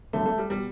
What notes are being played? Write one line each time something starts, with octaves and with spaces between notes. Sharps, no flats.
G2 D3 F#3 A3
A3
G3
B2 G3